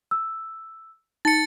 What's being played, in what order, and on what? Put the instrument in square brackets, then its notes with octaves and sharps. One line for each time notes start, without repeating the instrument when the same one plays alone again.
[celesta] E6
[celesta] D#4 A5 [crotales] A6 C#7